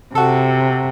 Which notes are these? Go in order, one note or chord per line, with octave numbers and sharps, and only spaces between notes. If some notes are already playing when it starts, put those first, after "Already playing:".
C3 F#4 A4